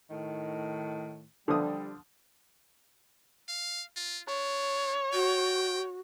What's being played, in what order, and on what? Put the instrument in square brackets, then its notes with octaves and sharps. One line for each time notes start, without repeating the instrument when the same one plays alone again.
[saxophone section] A2 D#3
[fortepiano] D3 F3 D#6 [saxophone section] G3
[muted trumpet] F5
F4
[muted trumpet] D4 [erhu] C#5
[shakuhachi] F#4 [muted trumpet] G5